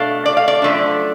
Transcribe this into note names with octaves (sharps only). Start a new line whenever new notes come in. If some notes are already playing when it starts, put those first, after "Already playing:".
Already playing: B2 A3 D4 F5
D5
F5
D5
F#2 F3 A3 D4